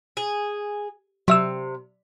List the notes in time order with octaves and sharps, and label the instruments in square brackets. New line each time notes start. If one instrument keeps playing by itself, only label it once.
[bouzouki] G#4
[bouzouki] C3 [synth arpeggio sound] F#3 E5 E6